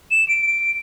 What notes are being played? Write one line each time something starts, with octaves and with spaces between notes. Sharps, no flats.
E7
D7
D7